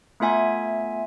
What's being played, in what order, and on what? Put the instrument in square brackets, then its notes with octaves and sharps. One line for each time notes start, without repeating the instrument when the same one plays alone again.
[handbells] A3 B3 F4 E5 G#5 G#6